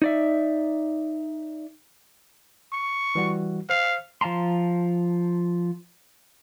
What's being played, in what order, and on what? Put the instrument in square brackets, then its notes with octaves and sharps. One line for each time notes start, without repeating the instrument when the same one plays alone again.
[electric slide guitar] D#4 D5 E5
[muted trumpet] C#6
[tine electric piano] E3 G3 F#4
[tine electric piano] C5 [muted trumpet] F5
[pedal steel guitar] F3 F5 A5 A#5 C6